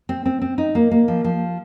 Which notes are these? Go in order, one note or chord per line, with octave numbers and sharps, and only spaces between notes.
C4
C4
C4
D#4
A#3
A#3
F3
F3